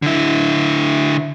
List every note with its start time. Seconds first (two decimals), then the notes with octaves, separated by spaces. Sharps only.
0.02 D3 E4